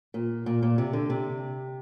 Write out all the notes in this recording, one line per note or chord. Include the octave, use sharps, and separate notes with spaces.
A#2
A#2
A#2
C3
D3
C3